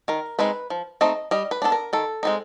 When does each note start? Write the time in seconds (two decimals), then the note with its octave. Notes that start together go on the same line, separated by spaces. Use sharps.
0.08 D#3 A#4
0.39 G#3 C4 D#4 B4
0.70 F3
1.01 A3 C4 D#4 D#5
1.31 G3 D#5
1.51 B4
1.62 B3 D4 A4
1.72 A#4
1.93 D#3 A4
2.23 G#3 C4 D#4